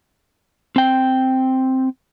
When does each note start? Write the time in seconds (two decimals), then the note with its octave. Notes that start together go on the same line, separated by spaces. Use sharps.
0.76 C4 G5